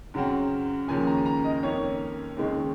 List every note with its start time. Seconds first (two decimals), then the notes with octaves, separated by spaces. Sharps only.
0.14 F#2 C#3 F#3 C4
0.88 D#2 C#3 F3 A#3 C#4 G#5
1.07 A#5
1.26 A#5
1.44 D#5
1.63 F2 D#3 A#3 C#4 C#5
2.37 D#2 C#3 G#3 C4